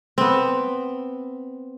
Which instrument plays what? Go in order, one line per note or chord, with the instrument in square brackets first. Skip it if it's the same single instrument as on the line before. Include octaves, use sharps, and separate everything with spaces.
[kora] B3 C4